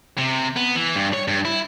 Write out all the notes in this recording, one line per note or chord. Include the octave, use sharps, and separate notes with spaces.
C3
B3
E3
G2
C#5
G2
E4